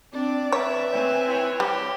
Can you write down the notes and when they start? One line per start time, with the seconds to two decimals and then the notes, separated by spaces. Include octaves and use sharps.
0.13 C4 D4 D5
0.52 B4 C#5 E5
0.91 C4 G#5
1.27 E4 C#5
1.60 G3 G4